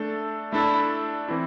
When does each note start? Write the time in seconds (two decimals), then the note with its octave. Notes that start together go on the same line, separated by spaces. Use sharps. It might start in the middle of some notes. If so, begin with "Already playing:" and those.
Already playing: A3 D4 A4
0.53 A3 D4 E4 A4
1.28 E3 C4 E4